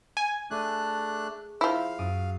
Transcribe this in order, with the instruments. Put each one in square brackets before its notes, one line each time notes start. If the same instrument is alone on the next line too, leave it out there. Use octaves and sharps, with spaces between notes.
[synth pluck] G#5
[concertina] A3 D4 F#6 [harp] G#4
[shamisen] F3 E4 [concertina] F5
[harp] F#2 D#6 D7